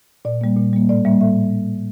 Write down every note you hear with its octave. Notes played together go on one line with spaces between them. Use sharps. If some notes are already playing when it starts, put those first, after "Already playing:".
A#2 D5
G3 A#3
A#2
G3 A#3
A2 D5
G3 A#3 E5
A2 E5